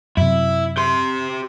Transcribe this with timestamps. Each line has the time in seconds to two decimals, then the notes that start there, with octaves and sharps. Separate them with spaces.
0.17 F#2 C3 E4
0.77 G4 C6